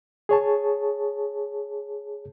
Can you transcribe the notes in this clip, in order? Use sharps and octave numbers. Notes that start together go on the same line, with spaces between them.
G#4 C#5 A5